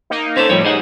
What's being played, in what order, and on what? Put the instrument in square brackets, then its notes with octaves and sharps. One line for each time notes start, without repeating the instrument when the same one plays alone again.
[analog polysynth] A#3 D#4
[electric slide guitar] C#4 A4 [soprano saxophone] C5
[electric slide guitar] A2 F3 C#5 [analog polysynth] G3
[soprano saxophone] D#4 [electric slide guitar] G#4 C5 F#5